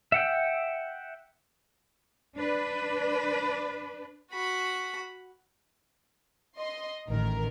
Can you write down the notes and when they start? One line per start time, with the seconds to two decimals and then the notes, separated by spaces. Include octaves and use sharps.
0.12 E5 F#5 G5
2.37 D4 B4
4.32 F#4 B5
6.57 D#5 C6
7.09 A1 D#3 A#4